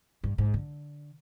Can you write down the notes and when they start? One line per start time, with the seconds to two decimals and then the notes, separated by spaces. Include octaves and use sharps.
0.24 G2
0.38 G#2
0.54 D3